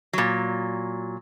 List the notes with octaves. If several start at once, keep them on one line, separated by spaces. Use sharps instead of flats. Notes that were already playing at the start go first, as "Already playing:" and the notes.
A#2 F#3